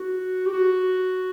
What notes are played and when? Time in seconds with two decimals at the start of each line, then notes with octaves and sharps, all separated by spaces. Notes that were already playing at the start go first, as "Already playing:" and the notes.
Already playing: F#4
0.46 G4
0.52 F#4